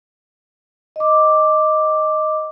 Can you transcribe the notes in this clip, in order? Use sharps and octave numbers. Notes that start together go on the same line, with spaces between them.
D#5 D6